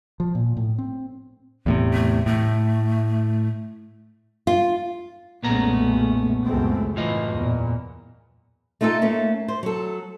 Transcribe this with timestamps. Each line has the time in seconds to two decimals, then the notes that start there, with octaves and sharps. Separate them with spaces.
0.20 F3
0.35 A#2
0.57 A2
0.78 C4
1.66 E2 A2 C3
1.93 A3
2.26 A2 A3
4.47 F4
5.43 B1 F#2 A#2 G#3 A3 B3 C#4 A#5
6.45 C#2 F#2 G#3 A3 C4
6.96 F#2 A2 E3 F4 D#5
7.33 E2 A#2
8.81 A3 D#4 F4 G#4 A4
9.02 A3 A#3 C#4
9.48 C5
9.63 F#3 A4